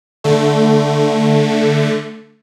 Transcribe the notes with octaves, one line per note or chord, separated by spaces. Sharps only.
D3 A3